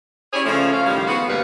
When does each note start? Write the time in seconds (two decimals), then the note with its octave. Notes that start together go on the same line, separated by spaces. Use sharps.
0.33 C#4 E4 G4 G#4 C#5 D5
0.45 C#3 F3 A3
0.73 C#4 F5
0.86 A2 D#3 F3 G3
1.07 B3 F#4 G#4
1.28 D#2 G#2 C3 G3 B4 F5